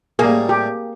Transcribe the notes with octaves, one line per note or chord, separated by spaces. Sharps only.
A2 G3 A#3 G#4
G4